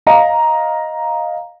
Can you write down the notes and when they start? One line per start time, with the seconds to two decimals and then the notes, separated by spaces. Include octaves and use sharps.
0.07 D#5 F5 A#5